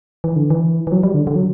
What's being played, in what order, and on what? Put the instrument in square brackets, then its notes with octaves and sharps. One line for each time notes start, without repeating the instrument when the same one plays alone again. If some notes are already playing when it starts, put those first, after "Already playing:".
[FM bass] E3
D3
E3
E3
F#3
G3
D3
D3
F#3